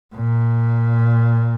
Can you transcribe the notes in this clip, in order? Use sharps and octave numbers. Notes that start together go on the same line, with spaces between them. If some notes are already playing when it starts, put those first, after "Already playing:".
A#2